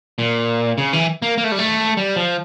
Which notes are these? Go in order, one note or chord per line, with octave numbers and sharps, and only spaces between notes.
A#2
C#3
E3
A#3
A#3
A3
G3
A3
G3
F3